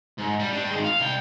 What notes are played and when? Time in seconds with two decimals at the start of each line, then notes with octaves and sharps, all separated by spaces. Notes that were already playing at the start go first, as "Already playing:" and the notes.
0.18 G#2
0.40 G3
0.54 D4 G5
0.71 D#3 G#3
0.84 F5
1.00 C2 G5